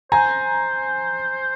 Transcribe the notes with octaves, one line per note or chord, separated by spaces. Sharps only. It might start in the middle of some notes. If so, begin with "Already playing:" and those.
C5 G#5 A#5